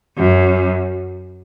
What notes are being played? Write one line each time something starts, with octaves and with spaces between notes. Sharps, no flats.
F#2